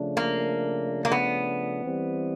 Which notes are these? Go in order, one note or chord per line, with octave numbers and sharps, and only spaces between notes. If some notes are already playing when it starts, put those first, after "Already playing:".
Already playing: C#3 F3 A3 D4
A#3
A#3
B3
E3 G3 C4